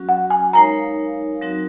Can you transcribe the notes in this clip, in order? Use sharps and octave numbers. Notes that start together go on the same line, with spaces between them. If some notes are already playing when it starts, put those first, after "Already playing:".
Already playing: F#3 C#4 F#4
F#5
G#5
G#3 D#4 A#4 C#5 F5 A#5
F#3 C4 D#4 F#4 A#4